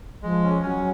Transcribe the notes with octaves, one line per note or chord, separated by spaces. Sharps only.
F3 G#3
C#4
F#3 C#4